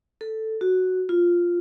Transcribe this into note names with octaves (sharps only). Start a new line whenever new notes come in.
A4
F#4
F4